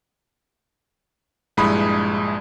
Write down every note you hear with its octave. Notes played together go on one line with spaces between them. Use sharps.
A#1 G2 G#3 E4 B5 D#6